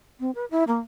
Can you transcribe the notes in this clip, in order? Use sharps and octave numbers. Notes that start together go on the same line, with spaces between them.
C4
B4
E4
A#3